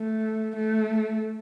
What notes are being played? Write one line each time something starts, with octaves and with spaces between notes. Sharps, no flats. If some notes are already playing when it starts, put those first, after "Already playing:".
Already playing: A3
A3